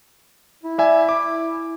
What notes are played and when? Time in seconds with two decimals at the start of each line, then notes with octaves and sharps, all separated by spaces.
0.63 E4
0.78 D5 E5 G#5
1.09 D6